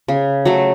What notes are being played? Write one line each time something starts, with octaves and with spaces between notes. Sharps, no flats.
C#3
F#3 A3